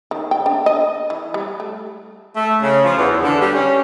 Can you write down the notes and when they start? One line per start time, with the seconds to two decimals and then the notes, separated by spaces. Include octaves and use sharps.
0.11 D#3
0.31 G5
0.46 D4
0.66 D#5
1.10 E3
1.34 G3
1.60 A3
2.36 A3
2.61 C#3
2.83 F3
2.97 E2
3.09 E2
3.21 D3
3.40 G3
3.53 C#4